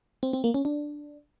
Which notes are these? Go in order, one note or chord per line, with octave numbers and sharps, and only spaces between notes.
C4
C4
A#3
C#4
D4